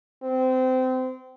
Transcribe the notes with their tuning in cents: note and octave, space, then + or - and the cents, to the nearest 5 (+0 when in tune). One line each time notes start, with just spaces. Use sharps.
C4 -25